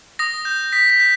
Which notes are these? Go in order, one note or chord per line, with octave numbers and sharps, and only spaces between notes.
D#6 A#6
G6
D#6 B6
B6
G6